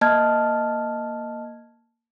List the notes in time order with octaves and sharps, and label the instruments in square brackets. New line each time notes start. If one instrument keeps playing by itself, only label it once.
[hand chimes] A#3 D#5 A5 F6 G#6